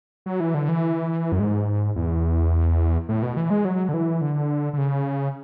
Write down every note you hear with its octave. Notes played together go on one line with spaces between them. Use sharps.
F#3
E3
D3
E3
F#2
G#2
E2
A2
B2
E3
G#3
F#3
D3
E3
D3
D3
C#3